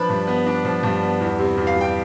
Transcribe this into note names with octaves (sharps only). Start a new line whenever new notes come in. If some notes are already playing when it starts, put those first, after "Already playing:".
Already playing: F3 D4 B4 B5
G2
B3
D4
F3
G2
B3
E2
C3
E2
F5
G3 G5